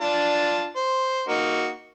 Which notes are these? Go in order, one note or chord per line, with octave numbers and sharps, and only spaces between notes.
D4 F4 A5
C5
A#3 D#4 F#4